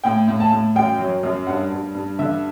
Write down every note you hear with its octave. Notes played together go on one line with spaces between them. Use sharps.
A2 G5
A2
A5
A2
F#2 G5
F#3
F#2
G2 F#5
G2
G2
D3 E5